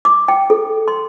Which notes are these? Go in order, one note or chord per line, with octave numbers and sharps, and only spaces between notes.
D6
G5
A4
C6